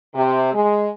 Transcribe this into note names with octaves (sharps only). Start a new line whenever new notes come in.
C3
G#3